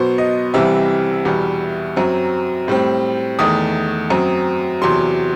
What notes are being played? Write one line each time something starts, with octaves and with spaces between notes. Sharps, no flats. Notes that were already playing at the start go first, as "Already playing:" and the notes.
Already playing: B2 F#3 B3 C5
D#5
C2 C3 E3 G3 C4 E5
E2 B2 G3
F#2 F#3 C4
A2 G3 C4
E2 D#3 A3 D#6
F#2 F#3 C4
E2 C3 F#3 C6